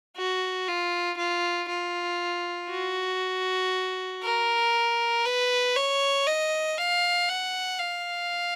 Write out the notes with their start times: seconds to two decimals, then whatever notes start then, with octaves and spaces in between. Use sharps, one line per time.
0.16 F#4
0.68 F4
1.18 F4
1.69 F4
2.71 F#4
4.23 A#4
5.25 B4
5.76 C#5
6.27 D#5
6.78 F5
7.29 F#5
7.80 F5